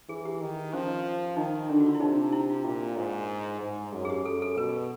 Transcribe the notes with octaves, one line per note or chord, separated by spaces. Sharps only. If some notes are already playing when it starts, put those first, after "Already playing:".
E3 G#4
G4
D#3
F3 C#4
D#3 D#4
D3 D4
F#4
F4
E4
C3 D#4
E4
F4
A#2 F4
G#2
G#2
F#2
G#4
G4
F#2 A4
A4
B2 B4